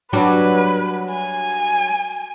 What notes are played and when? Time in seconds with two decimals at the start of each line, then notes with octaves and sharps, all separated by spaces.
0.13 F#3 G3 D4 B4
1.10 G#5